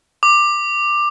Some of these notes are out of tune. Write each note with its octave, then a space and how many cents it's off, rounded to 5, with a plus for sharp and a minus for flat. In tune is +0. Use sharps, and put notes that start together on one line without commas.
D6 +15